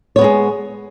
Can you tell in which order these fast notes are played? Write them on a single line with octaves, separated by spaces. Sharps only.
C#5 B3 G#3 G#4